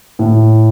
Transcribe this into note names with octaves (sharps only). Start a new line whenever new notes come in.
A2